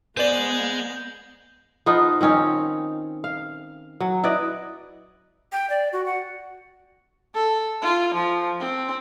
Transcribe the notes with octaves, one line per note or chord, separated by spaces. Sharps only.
B3 G#4 C5 D5 D#5 G6 F#7
F3 B3 D#4 F4
D#3 C4 C#4 D#4
F5
F#3
E4 B4 D5 D#5
G5
D5
F#4
F#5
A4
F4
F3
C4